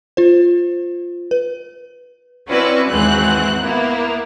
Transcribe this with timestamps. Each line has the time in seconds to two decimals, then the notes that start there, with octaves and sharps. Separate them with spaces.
0.17 F4 C5
1.31 B4
2.50 C4 C#4 E4 F#4 B4 D5
2.91 D#2 G#2 E3 C4 F#4 F#6
3.61 A#3 B3 E4